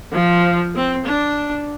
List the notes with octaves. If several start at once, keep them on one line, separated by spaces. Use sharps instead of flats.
F3
C4
D4